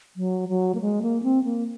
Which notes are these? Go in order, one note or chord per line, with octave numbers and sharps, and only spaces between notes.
F#3
F#3
A#3
G#3
A#3
C4
A#3